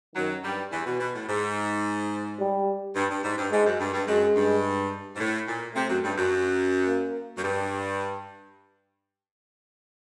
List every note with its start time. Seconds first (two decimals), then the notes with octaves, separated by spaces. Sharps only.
0.15 F#2 D#3 F#3
0.44 G2 G3
0.72 E2 E3
0.85 B2
1.00 B2
1.14 A2
1.28 G#2
2.39 G3
2.95 G2
3.10 G2
3.23 G#2
3.37 G2
3.51 G#2 G#3
3.65 F#2
3.79 G2
3.93 G2
4.07 F#2 G#3
4.35 G2
5.15 G#2
5.19 A2
5.47 A#2
5.74 C3 A3
5.89 F#2
6.03 G2
6.17 F#2
6.87 A#3
7.37 F#2
7.43 G2